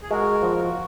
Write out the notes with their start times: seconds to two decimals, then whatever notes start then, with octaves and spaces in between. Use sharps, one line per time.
0.02 G#4
0.11 G#3 F#4 A#4
0.43 F3
0.57 F#4